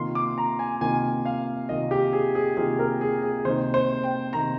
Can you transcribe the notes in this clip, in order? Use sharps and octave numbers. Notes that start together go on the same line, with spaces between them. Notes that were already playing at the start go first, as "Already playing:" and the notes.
Already playing: C3 D#3 A#3 F4 C6
D6
A#5
G#5
C3 D#3 A#3 F4 G#5
F5
C3 D#3 A#3 F4 D#5
G4
G#4
G#4
C3 D#3 A#3 F4 G#4
A#4
G#4
G#4
C3 D#3 A#3 D#4 C5
C5
G5
C3 D#3 A#3 D#4 A#5